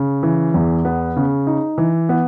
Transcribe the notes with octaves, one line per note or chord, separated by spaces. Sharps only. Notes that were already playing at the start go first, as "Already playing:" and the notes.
Already playing: C#3
E3
E2
B3
C#3
D#4
E3
B3